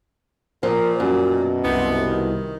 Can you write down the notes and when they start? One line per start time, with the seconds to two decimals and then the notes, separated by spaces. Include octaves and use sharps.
0.63 A#2 F3 A#4
1.00 F#2 G3
1.31 B2
1.64 C2 C3 B3
2.10 D#3